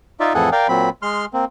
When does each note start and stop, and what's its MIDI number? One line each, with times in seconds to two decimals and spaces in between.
0.20 0.33 63
0.20 0.33 65
0.20 0.33 74
0.20 0.33 76
0.34 0.50 41
0.34 0.50 45
0.34 0.50 52
0.34 0.50 68
0.34 0.50 69
0.34 0.50 78
0.52 0.67 70
0.52 0.67 74
0.52 0.67 77
0.52 0.67 79
0.69 0.90 46
0.69 0.90 54
0.69 0.90 60
0.69 0.90 83
1.02 1.25 56
1.02 1.25 84
1.02 1.25 89
1.33 1.45 58
1.33 1.45 60